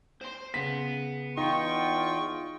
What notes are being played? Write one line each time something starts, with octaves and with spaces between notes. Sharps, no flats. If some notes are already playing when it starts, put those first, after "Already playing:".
C5 C6
C#3 B3 B6
E2 D#4 F4 G5 C#6